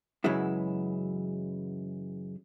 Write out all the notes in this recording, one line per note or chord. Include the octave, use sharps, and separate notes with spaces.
F#2 C#3 E3 F#3 G#3 E4